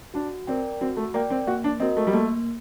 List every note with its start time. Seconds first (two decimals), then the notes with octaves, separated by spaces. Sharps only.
0.14 D4 F#4
0.47 C4 A#4 D5 G5
0.81 C4 F#4
0.97 A3
1.14 A#3 A#4 D5 G5
1.30 C4
1.47 A#3 F#4
1.64 D4
1.80 C4 F#4 A#4 D#5
1.97 A3
2.07 G3
2.13 A3 A#3